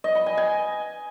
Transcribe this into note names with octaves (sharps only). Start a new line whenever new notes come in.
D#5
B5
G#5
G#5